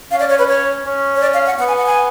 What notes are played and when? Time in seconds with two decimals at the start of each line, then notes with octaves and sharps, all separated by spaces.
0.11 C#4 F5
0.20 D5
0.29 C#5
0.39 B4
0.48 C#5
0.85 C#4
1.16 C#5
1.21 D5
1.34 F5
1.46 F#5
1.58 B3 F#5
1.68 G#5
1.78 F#5
1.86 G#5